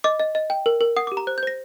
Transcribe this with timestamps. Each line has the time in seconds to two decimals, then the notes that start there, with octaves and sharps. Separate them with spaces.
0.04 D#5 D6
0.20 D#5
0.35 D#5
0.50 G5
0.66 A#4
0.81 A#4
0.97 F#5 D#6
1.07 D6
1.12 G4
1.17 A#5
1.27 C5 F#6
1.38 G6
1.43 C5 A#6